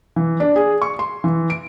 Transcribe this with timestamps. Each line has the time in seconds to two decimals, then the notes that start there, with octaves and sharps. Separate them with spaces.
0.16 E3
0.40 D4
0.56 G#4
0.82 C#6
0.99 C6
1.24 E3
1.50 D7